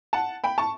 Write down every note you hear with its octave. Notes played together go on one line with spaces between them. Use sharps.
F#5 A5
G5 B5
A5 C#6